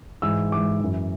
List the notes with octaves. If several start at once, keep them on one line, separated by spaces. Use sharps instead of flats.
G#2 E3 E6
G#2 E3 D6
F#2 E3